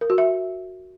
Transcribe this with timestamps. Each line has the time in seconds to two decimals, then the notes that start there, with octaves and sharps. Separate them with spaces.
0.01 A#4
0.10 F#4
0.18 E5